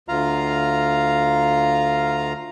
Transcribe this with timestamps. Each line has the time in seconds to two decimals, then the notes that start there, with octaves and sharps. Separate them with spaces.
0.09 D2 F4 F5 A#5